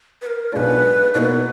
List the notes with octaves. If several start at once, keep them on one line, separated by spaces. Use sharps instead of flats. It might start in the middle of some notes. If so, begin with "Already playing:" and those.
B4
A#4
B1 B2 G#3 D4 F4 B4 D5
B2 A#3 D#4 A#4 B4 D5